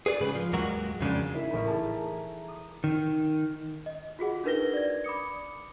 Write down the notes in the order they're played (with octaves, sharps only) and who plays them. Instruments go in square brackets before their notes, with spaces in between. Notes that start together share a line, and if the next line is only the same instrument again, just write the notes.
[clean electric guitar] G#4 B4 C#5 D5
G#2 C#3 G#4 B4
F3
D#2 G#2 F#3 G#3 F#4 A#4
F2 C#3 G#3 D4
[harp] E4 A#4 E5
A1 B5
G#4 A5 A#5
D#6
[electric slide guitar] D#3
[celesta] D#5
F4 F#4 G#4 F#5
D4 D#4 A#4 B4 A#6 G7
D5 G#6
B5 D6 D#6 C#7